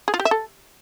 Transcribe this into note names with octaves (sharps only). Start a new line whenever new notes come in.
G#4
F4
G4
E5
A4